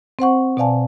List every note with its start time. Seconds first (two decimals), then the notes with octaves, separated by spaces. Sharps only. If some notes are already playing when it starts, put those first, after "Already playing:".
0.19 C4 C5 F#5 C#6
0.57 B2 C4 D5 F5 G#5 A5